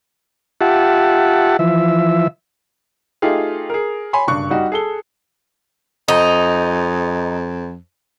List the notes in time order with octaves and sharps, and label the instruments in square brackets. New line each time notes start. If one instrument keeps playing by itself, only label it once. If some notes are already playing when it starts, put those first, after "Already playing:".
[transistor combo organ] F4 G4 E5 F#5 A5
E3 F3 E5
[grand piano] A3 D#4 F4 G4 G#4
G#4 A#4
C#5 G#5 B5 C6
F#1 G2 C#6 F#6
G3 D#4 F#4
G#4 A4 G7
[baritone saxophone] F2 [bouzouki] D#4